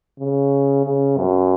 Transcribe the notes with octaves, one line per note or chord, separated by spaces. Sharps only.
C#3
C#3
F#2